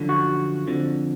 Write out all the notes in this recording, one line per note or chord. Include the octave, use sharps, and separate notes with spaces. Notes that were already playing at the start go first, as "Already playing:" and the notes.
Already playing: F#2 D3 F3
F#4
F2 D3 F3